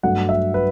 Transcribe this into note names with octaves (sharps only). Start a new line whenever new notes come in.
G2 F#3 A3 F#5
E5
B4